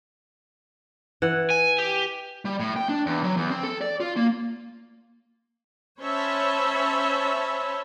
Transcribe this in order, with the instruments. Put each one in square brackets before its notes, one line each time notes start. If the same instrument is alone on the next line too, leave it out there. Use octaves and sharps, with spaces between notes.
[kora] E3 F#5
[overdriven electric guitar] G#5
G4
[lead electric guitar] G3
A2
G5
D4
E2
F#3
E2
C4
A4
D5
F4
A#3
[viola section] C#4 C5 C#5 E5 A5 B5